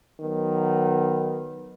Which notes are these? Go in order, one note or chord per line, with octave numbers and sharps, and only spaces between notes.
D#3 F#3 B3